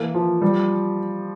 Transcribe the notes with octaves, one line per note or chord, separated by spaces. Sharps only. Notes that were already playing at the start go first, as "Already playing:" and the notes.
Already playing: E3 A#3
F3
G3